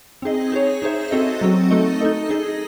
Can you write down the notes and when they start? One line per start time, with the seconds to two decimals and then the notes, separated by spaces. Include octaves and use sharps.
0.22 C4 D#4 G#4 D#5
0.52 D#4 G#4 C#5
0.82 D#4 G#4 C5 E5
1.11 C4 F#4 A4 D#5
1.41 F#3 C4 F#4
1.71 A3 D#4 A4 D#5
2.01 D#4 A4 D#5
2.29 D#4 G#4 D#5